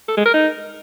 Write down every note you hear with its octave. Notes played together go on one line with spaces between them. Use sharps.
A4
G#3
A#4
D#4